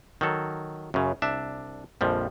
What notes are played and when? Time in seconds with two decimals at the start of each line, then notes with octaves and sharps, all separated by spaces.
0.21 D#3 F#3 A4
0.94 F#2 C#3
1.22 C2 D4 E5
2.01 A#1 F2 F3 G3